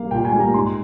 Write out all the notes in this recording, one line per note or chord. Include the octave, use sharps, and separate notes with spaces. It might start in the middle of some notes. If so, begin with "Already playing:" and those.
Already playing: G3 A#3 F5
A#2 G5
G#5
G3 A#3
A#5
G#2 C6